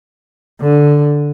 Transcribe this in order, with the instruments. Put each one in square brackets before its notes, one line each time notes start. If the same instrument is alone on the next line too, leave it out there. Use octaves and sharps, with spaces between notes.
[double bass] D3